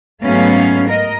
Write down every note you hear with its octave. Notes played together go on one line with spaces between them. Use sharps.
G#2 F#3 A3 B3 C#4 F5
A#4 D#5